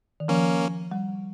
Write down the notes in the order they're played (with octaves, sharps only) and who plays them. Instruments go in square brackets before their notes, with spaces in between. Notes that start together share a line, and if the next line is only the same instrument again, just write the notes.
[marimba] D#3
[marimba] F3 [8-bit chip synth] A#3 C#4
[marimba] G3